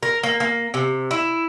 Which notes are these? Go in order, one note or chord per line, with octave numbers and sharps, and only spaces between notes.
A#4
A#3
A#3
C3
E4